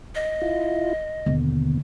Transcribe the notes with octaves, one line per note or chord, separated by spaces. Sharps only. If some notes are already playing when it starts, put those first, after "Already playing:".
D#5
E4 F4
D#2 B2 D3 A#3